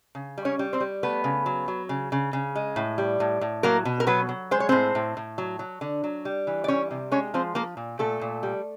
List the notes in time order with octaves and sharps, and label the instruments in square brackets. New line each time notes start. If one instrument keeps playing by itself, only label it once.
[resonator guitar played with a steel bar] C#3
G3
C#4 C#5
G3
C4 C5
G3
A3 B3 B4
C#3
F#3
F#3
C#3
C#3
C#3
G#3
A2
G3
A2
A2
F#3 A#3 A#4
B2
A#4
F#3 B3 B4
F#3
G#3 C5
C#5
A2 C4 C5
A2
A2
F#3
F#3
D3
F#3
G3
E3
D5
G3 C#4 C#5
C3
G#3 C#4 C#5
F3 C4 C5
F3 A#3 A#4
A#2
A#2 A3 A4
A#2
G3